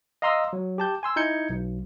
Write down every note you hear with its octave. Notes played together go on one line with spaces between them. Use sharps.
D#5 F5 A#5 C6 D#6 E6
F#3
G4 A5 G6
G#5 C6 E6
D#4 E4 G6 G#6 C#7
B1